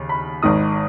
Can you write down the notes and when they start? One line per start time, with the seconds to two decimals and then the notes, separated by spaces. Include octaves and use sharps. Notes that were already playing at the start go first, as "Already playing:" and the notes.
Already playing: D#2 C#3
0.09 B5
0.43 G#1 G#2 D#3 D#6